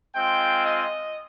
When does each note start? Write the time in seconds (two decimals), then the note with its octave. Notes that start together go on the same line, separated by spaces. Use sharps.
0.15 G#3 C4 F4 G5
0.66 D#5